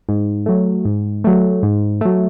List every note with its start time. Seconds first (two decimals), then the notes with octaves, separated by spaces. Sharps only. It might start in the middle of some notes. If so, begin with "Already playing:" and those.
0.09 G#2
0.46 F#3 A3
0.85 G#2
1.24 F#3 A3
1.63 G#2
2.01 F#3 A3